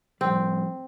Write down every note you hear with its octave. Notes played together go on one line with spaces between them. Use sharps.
A2 F3 G3 C4